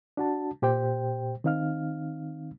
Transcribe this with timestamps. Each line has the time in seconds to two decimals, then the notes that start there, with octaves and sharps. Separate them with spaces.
0.17 D4 F#4 A5
0.62 A#2 G4 C5 G5
1.44 D#3 C4 D#4 F5 F6